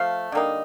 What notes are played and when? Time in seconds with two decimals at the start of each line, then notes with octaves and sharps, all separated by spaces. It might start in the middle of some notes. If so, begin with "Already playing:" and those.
Already playing: F3 A3 F5
0.32 D3 G3 A#3 D#4